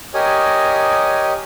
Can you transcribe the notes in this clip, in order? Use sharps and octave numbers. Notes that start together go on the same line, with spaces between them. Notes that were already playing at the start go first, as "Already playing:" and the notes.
G4 A#4 C#5 D#5 G#5 D#6